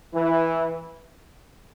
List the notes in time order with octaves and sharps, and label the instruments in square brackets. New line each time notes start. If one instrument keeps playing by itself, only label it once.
[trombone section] E3